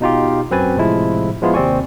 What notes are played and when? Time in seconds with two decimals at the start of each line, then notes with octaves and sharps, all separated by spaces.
0.01 B2 D#4 F4 G4
0.51 F#2 C4 F#4 B4 G#5 A6
0.76 A2 C3 F3 G#3 E4
1.42 F3 G#3 B3 E4 F4
1.54 D#2 C3 C4 D5 G#5 C#6